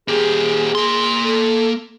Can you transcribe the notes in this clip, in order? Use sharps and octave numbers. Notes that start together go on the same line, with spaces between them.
A#2 G4 G#4
A#3 C6
A4